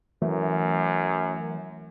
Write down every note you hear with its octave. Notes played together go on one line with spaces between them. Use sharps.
F#2 E3 F#3 A3